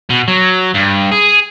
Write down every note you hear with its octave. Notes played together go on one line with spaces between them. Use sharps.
B2
F#3
G2
G#4